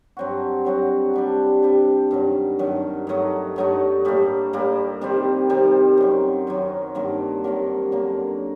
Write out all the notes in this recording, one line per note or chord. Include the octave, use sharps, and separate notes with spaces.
G2 F#3 C4 F#4
G2 F#3 C4 F#4
C3 G3 D4
C3 G3 D4
G2 D#3 F#3
G2 D#3 F#3
G2 F#3 A3 D#4
G2 F#3 A3 D#4
A2 G3 A#3
A2 G3 A#3
C3 D#3 G3 C4
C3 D#3 G3 C4
F#2 D#3 F#3
F#2 D#3 F#3
G2 D#3 F#3 A#3
G2 D#3 F#3 A#3
F#2 D3 F#3 A#3